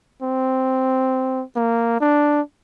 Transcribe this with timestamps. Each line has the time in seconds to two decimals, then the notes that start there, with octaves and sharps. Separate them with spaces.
0.22 C4
1.56 A#3
2.01 D4